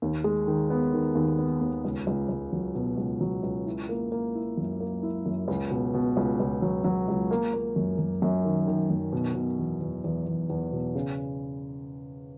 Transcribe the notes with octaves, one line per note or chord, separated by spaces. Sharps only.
D#2
G#3
D#3
B3
D#3
D#2
B3
D#2
C#2
C#2
C#2
F#3
B2
C#2
F#3
C#2
E4
A#3
A#3
E4
F#2
A#3
E4
F#2
C#2
B2
B2
C#2
C#2
F#3
F#3
C#2
A#3
A#3
F#2
F#2
F#2
D#3
D#3
F#2
B2
B2
E2
E2
E2
E2
E2
B2
C#3